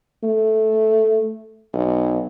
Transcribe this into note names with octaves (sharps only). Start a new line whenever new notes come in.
A3
B1